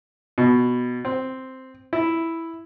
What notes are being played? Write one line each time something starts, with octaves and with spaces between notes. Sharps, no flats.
B2
C4
E4